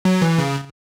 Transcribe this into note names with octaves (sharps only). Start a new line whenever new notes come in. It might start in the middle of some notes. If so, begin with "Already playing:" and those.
F#3
E3
C#3